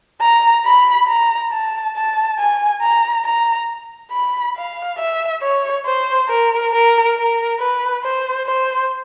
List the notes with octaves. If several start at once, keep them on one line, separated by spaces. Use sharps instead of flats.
A#5
B5
A#5
A5
A5
G#5
A#5
A#5
B5
F5
E5
C#5
C5
A#4
A#4
A#4
B4
C5
C5